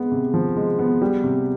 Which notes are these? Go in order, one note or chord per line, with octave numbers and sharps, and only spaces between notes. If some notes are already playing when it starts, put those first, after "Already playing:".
Already playing: G#3 B3
C3
F3
G#3
B3
G3
C3